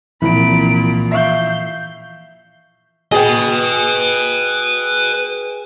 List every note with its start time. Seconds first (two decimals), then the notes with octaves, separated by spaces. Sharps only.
0.22 C2 A#2 E3 F3 B5 D7
1.12 E5 F5 C#6 G6 C7
3.12 G#4 B4 D#5 G5